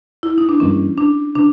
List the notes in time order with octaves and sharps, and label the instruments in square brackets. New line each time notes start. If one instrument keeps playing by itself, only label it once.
[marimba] E4
D#4
D4
[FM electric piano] G2 E3 G3 A#3 D#4 [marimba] C#4
[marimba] D4
[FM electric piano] C#3 [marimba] D4